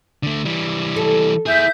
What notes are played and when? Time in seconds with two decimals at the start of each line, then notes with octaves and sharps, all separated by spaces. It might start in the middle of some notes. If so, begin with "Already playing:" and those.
0.23 D3 A3
0.45 E3 G3
0.96 A4
1.46 E4 G#4 E5 G6